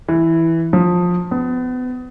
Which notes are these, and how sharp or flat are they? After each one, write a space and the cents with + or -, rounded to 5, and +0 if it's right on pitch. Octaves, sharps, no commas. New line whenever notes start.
E3 -5
F3 +20
B3 +30